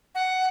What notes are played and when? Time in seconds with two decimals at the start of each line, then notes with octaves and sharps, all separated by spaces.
0.15 F#5